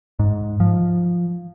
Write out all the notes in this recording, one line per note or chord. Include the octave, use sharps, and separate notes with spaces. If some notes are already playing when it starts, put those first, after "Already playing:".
G#2
F3